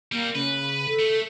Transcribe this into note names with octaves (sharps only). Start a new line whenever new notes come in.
G3 A#3 C4
C#3 B4
A4 B6
A3